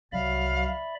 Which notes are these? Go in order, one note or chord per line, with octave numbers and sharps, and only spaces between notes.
C2 F#3 D5 E5 F5 B5